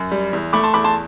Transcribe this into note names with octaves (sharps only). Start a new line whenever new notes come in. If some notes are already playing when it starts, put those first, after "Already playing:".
Already playing: F#2
G3
E2
A3 B5 D6
A5 C6
E2 B5 D6
A5 C6